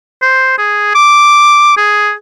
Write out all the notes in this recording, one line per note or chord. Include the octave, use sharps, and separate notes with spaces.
C5
G#4
D6
G#4